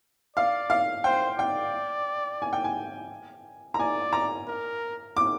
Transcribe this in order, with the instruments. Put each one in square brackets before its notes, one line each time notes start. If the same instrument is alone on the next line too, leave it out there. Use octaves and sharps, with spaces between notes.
[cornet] D5 [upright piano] F5
[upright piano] F5
[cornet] C5 [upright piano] G5
[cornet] D5 [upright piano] G5
[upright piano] G#5
G5
G#5
A#5
[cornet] D5 [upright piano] G#5
[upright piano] A#5
[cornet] A#4
[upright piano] D6